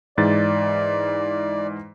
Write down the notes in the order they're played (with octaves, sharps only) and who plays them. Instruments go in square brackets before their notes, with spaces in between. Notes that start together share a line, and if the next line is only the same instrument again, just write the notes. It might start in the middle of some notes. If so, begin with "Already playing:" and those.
[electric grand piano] G#2 E3 A6 [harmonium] D5